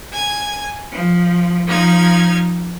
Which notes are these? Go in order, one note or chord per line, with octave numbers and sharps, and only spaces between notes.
G#5 G#6
F3
F3 D#4 F6 G#6